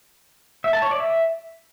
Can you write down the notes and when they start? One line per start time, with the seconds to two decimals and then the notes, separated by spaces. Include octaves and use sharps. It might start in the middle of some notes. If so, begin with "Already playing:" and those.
0.64 E5
0.73 A5
0.82 C#5
0.91 D5
1.00 E5